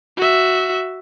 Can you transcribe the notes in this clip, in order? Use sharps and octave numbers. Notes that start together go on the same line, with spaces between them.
F#4 E5